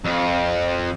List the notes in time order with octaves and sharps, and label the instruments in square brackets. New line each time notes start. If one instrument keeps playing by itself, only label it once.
[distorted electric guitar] F2